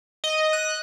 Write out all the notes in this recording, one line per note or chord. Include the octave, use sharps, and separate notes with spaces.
D#5
F#6